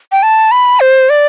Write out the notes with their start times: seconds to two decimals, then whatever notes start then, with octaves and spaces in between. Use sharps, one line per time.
0.12 G5
0.23 A5
0.51 B5
0.80 C5
1.10 D5